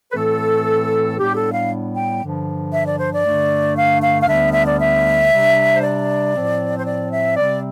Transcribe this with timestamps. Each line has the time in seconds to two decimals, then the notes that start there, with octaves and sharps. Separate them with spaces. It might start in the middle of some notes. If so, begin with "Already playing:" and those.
0.11 B4
0.15 A2 E3 A3 C4 A4
1.17 A2 G3 B3 D4 G4
1.35 A4
1.52 F5
1.95 G5
2.21 G2 D3 F3
2.72 E5
2.86 D5
2.99 C5
3.13 D5
3.24 G2 D3 A3 D4
3.76 F5
4.01 F5
4.22 F5
4.27 D2 D3 G3 B3 D4 E5
4.53 E5
4.66 D5
4.80 E5
5.30 C3 G3 D4
5.74 C5
5.82 D5
6.34 A2 F3 C4
6.78 C5
6.85 D5
7.12 E5
7.36 C3 G3 C4 D5